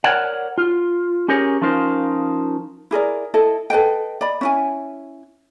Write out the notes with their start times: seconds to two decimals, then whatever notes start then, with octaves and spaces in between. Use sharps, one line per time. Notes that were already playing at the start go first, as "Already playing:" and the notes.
0.04 A#4 C#5 D5 F#5
0.58 F4
1.28 C#4 G4 G#4 A#4 C#5
1.62 F3 C#4 D#4 F4 A#4 C5
2.91 E4 G#4 A#4 D5
3.34 E4 A4 D#5
3.70 A4 B4 D#5 G5
4.21 D5 D#5 B5
4.41 C#4 E4 G#5